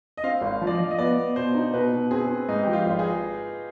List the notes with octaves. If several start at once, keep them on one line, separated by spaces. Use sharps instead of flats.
D#5
C4 F5
G#1
F3
D5
D#5
F3 F5
D#5
B3 D5
B3
B2 C5
D#4
B2 B4
B2
C4 G#4
C4
G#2 D#4
F3 G4
F4
G#1
G#4